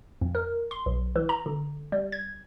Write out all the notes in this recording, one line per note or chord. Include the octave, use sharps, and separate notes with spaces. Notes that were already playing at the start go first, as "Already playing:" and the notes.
F2
A#4
C6
B1
E3
A#5
D3
G3
G#6